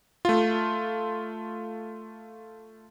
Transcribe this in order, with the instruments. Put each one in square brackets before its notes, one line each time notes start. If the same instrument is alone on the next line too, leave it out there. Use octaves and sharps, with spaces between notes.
[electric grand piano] A3 F4